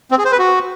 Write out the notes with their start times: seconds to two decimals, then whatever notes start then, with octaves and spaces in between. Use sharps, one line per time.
0.11 C4
0.18 G#4
0.25 C5
0.32 B4
0.39 F#4